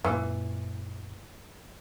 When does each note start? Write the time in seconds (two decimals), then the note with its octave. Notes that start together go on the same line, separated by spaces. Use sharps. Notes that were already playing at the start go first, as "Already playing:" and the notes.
0.04 F#2 A#2 E3